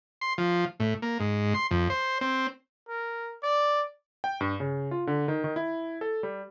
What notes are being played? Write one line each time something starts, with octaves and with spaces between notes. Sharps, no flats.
C6
F3
A2
A#3
G#2
C6
F2
C5
C4
A#4
D5
G5
G2
C#3
F4
D3
D#3
D#3
E4
A4
G3